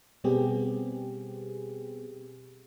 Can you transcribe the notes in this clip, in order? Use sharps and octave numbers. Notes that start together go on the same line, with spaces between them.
B2 G3 B3 C4 G4 G#4